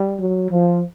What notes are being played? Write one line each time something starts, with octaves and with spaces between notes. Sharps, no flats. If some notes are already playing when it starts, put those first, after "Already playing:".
Already playing: G3
F#3
F3